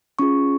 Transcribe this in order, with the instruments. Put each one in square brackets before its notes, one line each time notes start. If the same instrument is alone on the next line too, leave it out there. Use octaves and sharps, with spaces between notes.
[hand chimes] C#4 F4 G#4 C#6